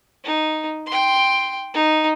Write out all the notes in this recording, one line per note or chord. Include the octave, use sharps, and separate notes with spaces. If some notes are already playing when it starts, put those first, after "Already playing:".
D#4
G5 C6
D#4